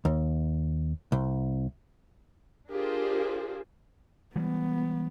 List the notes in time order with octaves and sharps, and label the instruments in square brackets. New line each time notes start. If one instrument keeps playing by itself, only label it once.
[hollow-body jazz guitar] D#2
C2
[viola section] D4 F4 G4 G#4 A#4 C5
[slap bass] E3 G3 G#3 [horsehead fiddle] B3